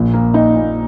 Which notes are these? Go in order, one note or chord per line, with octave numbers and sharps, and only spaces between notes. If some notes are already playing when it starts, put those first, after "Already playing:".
Already playing: A#1 A#2
A#3
D#4
A#2